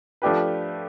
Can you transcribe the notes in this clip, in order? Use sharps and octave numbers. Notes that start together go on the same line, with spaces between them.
F3 A3 D4 G4 B4